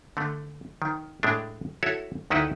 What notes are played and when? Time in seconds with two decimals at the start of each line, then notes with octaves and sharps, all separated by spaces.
0.17 D3 A3
0.82 D#3
1.23 A2 G#3 A3 D4
1.83 E4 F#4 A4 C#5
2.30 D2 D#3 D#4 E4 B4 F#5